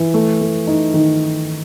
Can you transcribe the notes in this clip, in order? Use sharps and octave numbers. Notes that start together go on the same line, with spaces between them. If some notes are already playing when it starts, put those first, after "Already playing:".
Already playing: E3
A3
A3
D#4
D#3